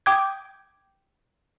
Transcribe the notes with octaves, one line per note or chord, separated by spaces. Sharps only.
G5 D6 D#6 G6 G#6